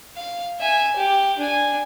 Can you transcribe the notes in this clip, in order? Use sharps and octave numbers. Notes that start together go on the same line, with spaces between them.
F5
E5 G#5
G4
D4 G#5